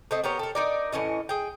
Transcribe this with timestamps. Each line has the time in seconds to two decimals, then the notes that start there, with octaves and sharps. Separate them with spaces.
0.11 A3 C4 D#5
0.24 B3 G4 A#4 C#5
0.39 A4 A#4
0.55 D#4 A#4 D5
0.92 A2 E3 C#4 D#5
1.29 G#4 G5